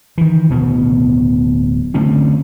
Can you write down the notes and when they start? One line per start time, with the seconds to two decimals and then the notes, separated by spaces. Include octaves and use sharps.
0.18 D#3 E3
0.50 D1 B2 B3
1.94 D3 A3 C4 C#4